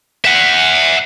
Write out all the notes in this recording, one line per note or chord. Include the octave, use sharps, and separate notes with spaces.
E5 F#5